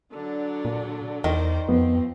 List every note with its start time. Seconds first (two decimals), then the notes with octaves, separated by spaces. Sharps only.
0.12 D3 F#3 D4
0.65 A#2
1.24 E2 D#3 A#4 C5 D5
1.69 F2 F3 B3 C4